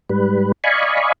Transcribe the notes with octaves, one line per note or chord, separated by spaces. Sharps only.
G#2 G3 B4
D5 D#5 F5 G#5 B5 C#6